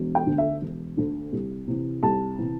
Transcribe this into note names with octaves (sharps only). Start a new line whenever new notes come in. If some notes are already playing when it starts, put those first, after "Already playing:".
Already playing: E1
G5
D2 D3
E5
E1
D2 D3
C2
C3 E3
C2 A5
C3 E3